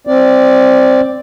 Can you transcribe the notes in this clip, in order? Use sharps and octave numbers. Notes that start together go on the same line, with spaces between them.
C4 D5